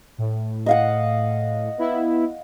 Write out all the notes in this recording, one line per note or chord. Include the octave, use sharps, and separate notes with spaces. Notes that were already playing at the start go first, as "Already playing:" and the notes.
A2
D#5 F5 F#5
B3 E4